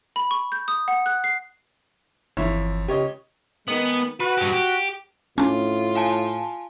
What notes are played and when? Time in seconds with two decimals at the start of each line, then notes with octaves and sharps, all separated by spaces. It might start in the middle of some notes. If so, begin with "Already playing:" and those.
0.16 B5
0.31 C#6
0.52 G6
0.68 D#6
0.88 F#5
1.06 F#6
1.24 C7
2.37 G1 F2 E3 E4 C#5
2.88 C#2 G4 C#5 D#5
3.68 D#3 G#3 B3
4.20 F#4 B4
4.38 G2 G4
4.53 G4
5.38 A2 C#4 D4 F4
5.95 F5 G#5 A5